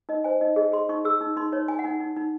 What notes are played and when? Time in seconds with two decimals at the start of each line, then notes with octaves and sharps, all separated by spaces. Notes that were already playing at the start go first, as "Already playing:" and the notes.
0.09 D#4 D#5
0.24 C5 G#5
0.41 D#4 D#5
0.56 G#4 D#5
0.72 G#4 C6
0.89 D#4 C#6
1.05 G#4 E6
1.21 D#4
1.37 D#4 C6
1.52 D#4 C#5
1.68 D#4 G#5
1.79 F#5
1.84 D#4 G#5
2.00 D#4
2.16 D#4